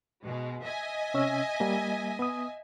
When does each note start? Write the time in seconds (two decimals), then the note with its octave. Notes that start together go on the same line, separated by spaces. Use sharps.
0.24 B2 G#3
0.64 D#5 E5 G#5
1.14 C3 C#4 E6
1.60 G3 A#3
2.19 B3 D#6